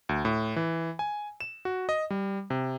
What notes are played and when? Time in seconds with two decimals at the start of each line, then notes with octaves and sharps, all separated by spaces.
0.09 D2
0.25 A2
0.56 E3
0.99 G#5
1.41 E7
1.65 F#4
1.89 D#5
2.10 G3
2.50 C3